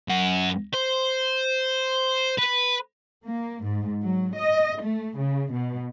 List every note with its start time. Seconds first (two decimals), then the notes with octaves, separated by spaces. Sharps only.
0.09 F#2 F#5
0.73 C5
2.38 B4
3.26 A#3
3.64 G#2
4.02 F#3
4.35 D#5
4.81 A3
5.18 C#3
5.52 B2